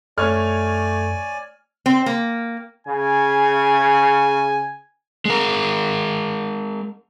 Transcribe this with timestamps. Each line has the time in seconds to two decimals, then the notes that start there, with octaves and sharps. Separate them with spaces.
0.18 F#2 A3 C#5 D5 G#5 F6
1.86 C4
2.06 A#3
2.87 C#3 G#5
5.25 G#3 A#4